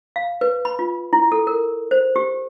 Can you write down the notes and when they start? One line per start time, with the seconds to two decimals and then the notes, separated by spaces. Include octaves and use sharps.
0.16 F5
0.41 B4
0.65 B5
0.79 F4
1.13 E4
1.32 A4
1.47 A#4
1.91 C5
2.16 G4